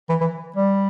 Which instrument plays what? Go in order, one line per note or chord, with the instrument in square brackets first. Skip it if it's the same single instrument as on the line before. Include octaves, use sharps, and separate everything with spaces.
[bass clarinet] E3
E3
G3